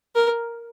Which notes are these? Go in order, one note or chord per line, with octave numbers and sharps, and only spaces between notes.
A#4